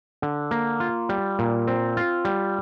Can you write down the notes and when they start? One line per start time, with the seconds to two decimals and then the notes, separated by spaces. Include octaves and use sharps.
0.22 D3
0.51 A#3
0.80 F4
1.09 G3
1.39 A#2
1.67 C4
1.97 F4
2.25 G3